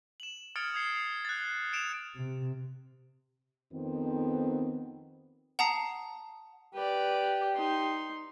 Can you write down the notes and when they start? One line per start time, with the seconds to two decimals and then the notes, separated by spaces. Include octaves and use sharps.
0.20 E7 F#7
0.56 D#6 F6 G#6 A6 C#7 D7
0.74 D#6 G#6 C7 C#7
1.25 F#6 A6
1.73 C#7 D7 E7 F7
2.15 C3
3.73 F2 D#3 B3 C4
5.59 F#5 A5 A#5 D#6 C7
6.75 G4 B4 D5
7.55 D#4 C6